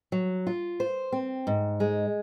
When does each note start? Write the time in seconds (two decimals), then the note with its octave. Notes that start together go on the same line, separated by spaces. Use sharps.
0.12 F#3
0.47 F4
0.80 C5
1.12 C4
1.47 G#2
1.80 G#3